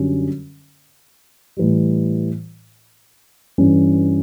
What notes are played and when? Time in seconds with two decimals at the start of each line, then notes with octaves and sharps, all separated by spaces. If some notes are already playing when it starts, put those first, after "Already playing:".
Already playing: F#2 D3 G3 C#4
1.57 A2 E3 G3
3.58 G2 E3 G3 C#4